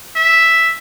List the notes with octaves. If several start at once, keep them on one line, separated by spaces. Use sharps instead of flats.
E5